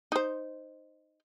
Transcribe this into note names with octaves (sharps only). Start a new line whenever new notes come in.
D#4 C5